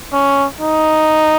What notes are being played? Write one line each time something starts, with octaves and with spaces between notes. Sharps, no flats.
C#4
D#4